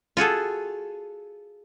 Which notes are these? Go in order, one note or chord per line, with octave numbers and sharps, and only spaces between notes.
F4 F#4 G#4 A4